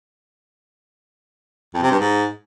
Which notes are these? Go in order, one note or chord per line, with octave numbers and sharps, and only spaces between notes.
F2
C3
G2
G#2